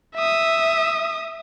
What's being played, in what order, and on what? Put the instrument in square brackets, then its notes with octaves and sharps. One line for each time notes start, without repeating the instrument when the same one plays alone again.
[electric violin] E5 D#6